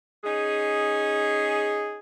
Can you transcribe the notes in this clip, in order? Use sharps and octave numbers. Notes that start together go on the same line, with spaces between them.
C#4 D#4 G#4